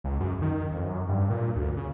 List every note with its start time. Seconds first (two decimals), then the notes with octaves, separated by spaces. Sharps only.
0.04 C#2
0.20 F#2
0.42 D#3
0.71 F2
0.85 F#2
1.09 G2
1.30 A#2
1.56 D2
1.77 C#3